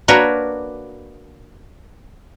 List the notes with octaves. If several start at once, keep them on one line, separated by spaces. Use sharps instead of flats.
A#3 D4 F#4 A#4 B4 C#5